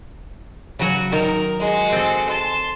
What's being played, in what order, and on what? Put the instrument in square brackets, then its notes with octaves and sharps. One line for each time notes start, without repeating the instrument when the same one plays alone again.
[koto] C#3 F#3 [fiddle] F#4
[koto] D#3 [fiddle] A#4
[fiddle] G#3 F#4
[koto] C4 A4
[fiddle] A5 C6